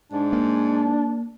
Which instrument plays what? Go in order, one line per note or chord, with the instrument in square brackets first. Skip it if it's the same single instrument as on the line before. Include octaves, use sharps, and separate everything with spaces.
[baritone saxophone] G#2 [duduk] D4
[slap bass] A#3